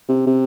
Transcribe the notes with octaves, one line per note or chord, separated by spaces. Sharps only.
C3
C3